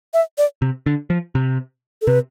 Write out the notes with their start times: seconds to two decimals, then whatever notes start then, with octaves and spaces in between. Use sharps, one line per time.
0.14 E5
0.38 D5
0.62 C3
0.86 D3
1.10 F3
1.35 C3
2.02 A4
2.07 C3 B4